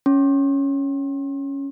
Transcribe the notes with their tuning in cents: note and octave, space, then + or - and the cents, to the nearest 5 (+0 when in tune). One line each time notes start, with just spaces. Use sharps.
C#4 +0 C6 +40